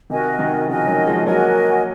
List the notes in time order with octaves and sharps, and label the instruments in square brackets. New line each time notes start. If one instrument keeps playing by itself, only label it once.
[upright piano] C3 D#3 [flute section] F#4 A#4 D#5 G#5
[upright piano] C3 D#3
[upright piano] C#3 F3 [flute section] F#4 A#4 D#5 G#5
[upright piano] D#3 F#3
F3 G#3
[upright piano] F#3 A#3 [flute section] F#4 A#4 D#5 G#5